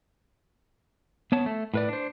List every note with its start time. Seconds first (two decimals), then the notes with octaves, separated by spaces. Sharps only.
1.32 B3 C#5 A5
1.46 A3
1.74 A2 B4 D5
1.89 D4 C5